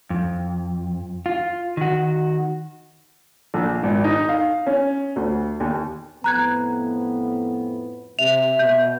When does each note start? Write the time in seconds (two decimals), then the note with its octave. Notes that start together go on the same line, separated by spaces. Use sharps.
0.10 F2
1.26 F4
1.77 D#3 F#4
3.54 A#1
3.83 G#1
4.04 D#4
4.29 F5
4.66 C#4
5.16 D2
5.60 D#2
6.24 F2 A2 B3 A#5 F#6 G#6
8.19 C3 E5 F7
8.59 B2 G6